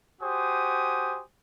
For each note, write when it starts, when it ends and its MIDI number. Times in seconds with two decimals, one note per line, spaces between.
0.22 1.22 66
0.22 1.22 67
0.22 1.22 72
0.22 1.22 80
0.22 1.22 87